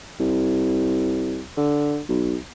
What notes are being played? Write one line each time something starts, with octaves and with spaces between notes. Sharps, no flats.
C2
D3
B1